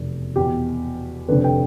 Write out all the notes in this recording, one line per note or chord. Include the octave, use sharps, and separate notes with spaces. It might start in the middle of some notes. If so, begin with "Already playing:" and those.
Already playing: F1 E2 B2
E2 B2 G4
F1 F2 D3 B4
G5